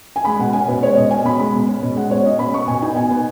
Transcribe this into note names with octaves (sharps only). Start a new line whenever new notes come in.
G#5
G#3 B5
B2 F#5
C#4 G#5
B2 B4
G#3 C#5
B2 D#5
C#4 G#5
B2 B5
G#3 B5
B2
C#4
B2
G#3 F#5
B2 C#5
C#4 D#5
B2 B5
B3 C#6
B2 G#5
D#4 G#5
B2 G#5
B3